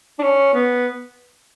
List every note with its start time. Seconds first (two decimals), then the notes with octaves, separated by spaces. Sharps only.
0.19 D4
0.23 C#4
0.54 B3